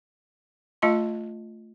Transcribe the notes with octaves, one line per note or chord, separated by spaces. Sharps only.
A3 F4 D#5 A5 C#6